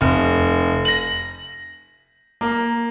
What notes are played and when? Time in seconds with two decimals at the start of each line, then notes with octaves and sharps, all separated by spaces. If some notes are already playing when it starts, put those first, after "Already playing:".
0.01 F1
0.85 A#6 F#7
2.41 A#3